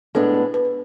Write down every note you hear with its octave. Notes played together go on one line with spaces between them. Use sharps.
A2 G#3 B3 D4 A4
B4
B4
B4